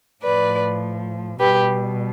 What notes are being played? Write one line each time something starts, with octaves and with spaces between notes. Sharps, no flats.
A2 F3 B4 D5
B2 G3 G4 B4